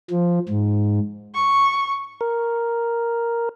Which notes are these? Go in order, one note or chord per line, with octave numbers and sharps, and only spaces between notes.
F3
G#2
C#6
A#4